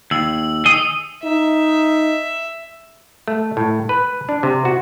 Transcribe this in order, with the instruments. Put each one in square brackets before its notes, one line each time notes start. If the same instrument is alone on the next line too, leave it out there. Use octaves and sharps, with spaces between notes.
[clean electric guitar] D#2 [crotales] E6 F#7
[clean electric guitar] D#3 G#4 D#5 [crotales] D#6 C#7
[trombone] D#4 [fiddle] E5
[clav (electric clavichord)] A3
A2
B4
D4
C3
F#4